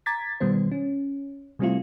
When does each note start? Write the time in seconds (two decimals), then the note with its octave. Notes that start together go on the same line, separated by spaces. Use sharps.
0.06 A#5 D6 G#6 A6 B6
0.40 B2 D#3 G3 B3 C5
0.72 C#4
1.59 C3 G3 A3 C4 E4 F4